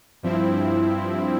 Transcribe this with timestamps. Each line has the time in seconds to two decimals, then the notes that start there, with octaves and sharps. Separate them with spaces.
0.23 G2 F3 C4 E4